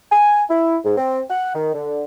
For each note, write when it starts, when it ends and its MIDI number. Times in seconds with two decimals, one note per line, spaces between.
0.11 0.43 80
0.49 0.76 64
0.84 0.93 44
0.97 1.20 60
1.30 1.52 78
1.54 1.69 51
1.74 2.03 50